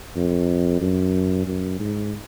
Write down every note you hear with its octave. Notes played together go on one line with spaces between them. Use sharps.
F2
F#2
F#2
G#2